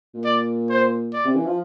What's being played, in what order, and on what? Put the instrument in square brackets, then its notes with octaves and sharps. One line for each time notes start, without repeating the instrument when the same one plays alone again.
[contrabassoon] A#2
[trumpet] D5
C5
D5
[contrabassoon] C3
E3
F3